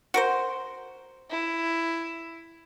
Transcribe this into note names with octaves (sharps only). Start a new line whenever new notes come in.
F#4 A#4 C5
E4